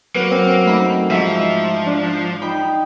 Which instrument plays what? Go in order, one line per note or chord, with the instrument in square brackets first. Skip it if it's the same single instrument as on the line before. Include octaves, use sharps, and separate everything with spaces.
[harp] F#3 F#4 [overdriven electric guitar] A#3 [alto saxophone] B4
[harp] F#2 [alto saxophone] C4
[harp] A3 D#4 B5
[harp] G#2 E4 [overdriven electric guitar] F3 [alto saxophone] E5
[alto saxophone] D4
[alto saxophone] D#4 [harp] G5 B5